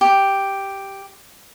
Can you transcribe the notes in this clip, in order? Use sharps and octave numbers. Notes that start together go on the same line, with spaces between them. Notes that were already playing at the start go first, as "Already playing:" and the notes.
G4